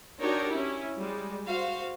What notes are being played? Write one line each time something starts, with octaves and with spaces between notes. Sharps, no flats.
D4 D#4 F#4 G4 A#4 C#5
C#4 E4
G3 G#3
F#4 C5 F5